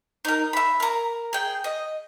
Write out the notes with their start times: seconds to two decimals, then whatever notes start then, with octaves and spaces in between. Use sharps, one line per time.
0.25 D#4 A#4
0.53 E5 B5
0.80 A#4 A#5
1.33 G#4 G5
1.64 D#5